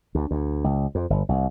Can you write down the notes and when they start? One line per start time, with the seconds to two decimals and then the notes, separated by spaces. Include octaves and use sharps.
0.15 D2
0.31 D2
0.64 C#2
0.95 F2
1.10 G1
1.29 C2